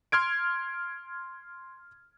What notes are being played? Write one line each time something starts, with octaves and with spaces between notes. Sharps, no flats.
C6 F6 G#6 D7